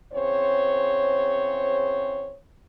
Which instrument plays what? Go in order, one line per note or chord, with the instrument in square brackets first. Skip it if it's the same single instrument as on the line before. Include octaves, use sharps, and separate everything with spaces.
[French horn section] E2 C#3 C4 C5 C#5